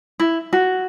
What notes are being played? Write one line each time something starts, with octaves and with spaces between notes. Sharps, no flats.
E4
F#4